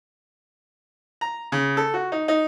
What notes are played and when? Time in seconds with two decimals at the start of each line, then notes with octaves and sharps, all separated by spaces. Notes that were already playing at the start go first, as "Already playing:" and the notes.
1.21 A#5
1.52 C#3
1.77 A4
1.94 F#4
2.12 D#4
2.28 D#4